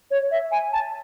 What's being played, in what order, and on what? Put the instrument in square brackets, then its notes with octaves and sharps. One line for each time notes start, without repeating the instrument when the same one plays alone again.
[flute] C#5
E5
G#5
A5